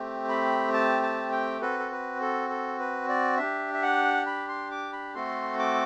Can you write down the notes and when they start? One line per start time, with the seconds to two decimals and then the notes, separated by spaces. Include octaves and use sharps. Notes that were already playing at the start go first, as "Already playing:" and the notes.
Already playing: A3 C4 G4
0.29 B5
0.73 A5
1.03 A5
1.32 G5
1.61 C4 F#4 A4 B4
1.79 A4
1.91 B4
2.21 A4
2.50 A4
2.79 B4
3.08 D5
3.38 D4 G4 E5
3.73 E5
3.82 F#5
4.26 B5
4.48 C6
4.71 D6
4.93 B5
5.15 A3 C4 F#4 A4 C6
5.59 D6